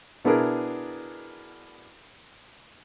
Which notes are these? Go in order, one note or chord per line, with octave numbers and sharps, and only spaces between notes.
B2 B3 D4 E4 G#4 A#4